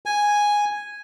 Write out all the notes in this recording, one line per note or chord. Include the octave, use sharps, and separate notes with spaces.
G#5